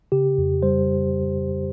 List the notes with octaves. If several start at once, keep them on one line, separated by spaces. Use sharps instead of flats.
C#3 G4
F2
G3 C5